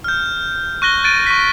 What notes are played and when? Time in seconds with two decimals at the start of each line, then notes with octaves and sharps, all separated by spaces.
0.04 F6 G6
0.82 C#6 F#6 A#6 G7
1.04 F#6 A6 D7 D#7
1.26 C#6 B6